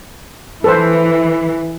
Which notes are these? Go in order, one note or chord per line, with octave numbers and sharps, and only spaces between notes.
E3 A4 B4 C5